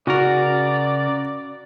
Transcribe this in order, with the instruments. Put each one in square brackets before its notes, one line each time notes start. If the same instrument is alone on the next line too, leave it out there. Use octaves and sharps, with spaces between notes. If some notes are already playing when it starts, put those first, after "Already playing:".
[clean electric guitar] C#3 A#4 [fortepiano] F#4 [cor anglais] D5